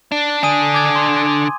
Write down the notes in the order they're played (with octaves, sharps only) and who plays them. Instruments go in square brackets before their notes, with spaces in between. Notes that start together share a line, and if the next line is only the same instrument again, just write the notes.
[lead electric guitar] D4
[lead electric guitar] D3 D4 [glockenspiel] G#5 D#6 D#7
[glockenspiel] D6 G#6
C6